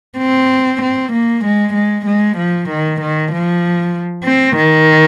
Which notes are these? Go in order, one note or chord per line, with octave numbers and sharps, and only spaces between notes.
C4
C4
A#3
G#3
G#3
G#3
F3
D#3
D#3
F3
C4
D#3